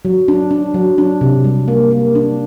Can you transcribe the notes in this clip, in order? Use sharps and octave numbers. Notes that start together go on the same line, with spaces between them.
F#3
D4
D4
F#3
D4
C3
G3
A#3
A#3
D4